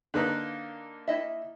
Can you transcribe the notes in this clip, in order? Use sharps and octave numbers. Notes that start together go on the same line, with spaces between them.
D3 A#3 D#4 B4
E4 D#5 E5